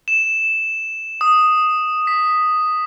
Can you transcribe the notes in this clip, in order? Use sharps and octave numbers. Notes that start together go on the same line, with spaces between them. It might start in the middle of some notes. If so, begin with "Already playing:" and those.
E7
D#6
B6